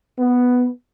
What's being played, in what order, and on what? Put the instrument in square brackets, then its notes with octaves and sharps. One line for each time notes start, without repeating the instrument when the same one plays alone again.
[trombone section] B3